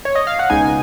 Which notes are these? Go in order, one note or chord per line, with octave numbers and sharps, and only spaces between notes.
C#5
D#5
F5
F#5
C#2 B2 G#3 D#4 G#5